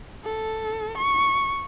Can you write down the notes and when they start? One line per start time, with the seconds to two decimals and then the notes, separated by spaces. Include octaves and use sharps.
0.25 A4
0.98 C#6